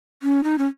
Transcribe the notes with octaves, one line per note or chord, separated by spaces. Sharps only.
C#4
D#4
C#4